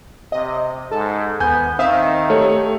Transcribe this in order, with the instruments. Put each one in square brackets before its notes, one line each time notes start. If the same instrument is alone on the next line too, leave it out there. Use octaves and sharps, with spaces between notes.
[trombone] C3 [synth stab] D#5
[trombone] G#2 [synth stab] A4
[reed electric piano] D#2 G6 [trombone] B3 [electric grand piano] G#5
[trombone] D#3 [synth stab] C4 E5 [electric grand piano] F5 [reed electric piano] D#6
[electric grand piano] A3 C#5 [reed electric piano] G4 A4